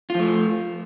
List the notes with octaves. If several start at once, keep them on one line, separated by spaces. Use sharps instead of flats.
F3 A3 F4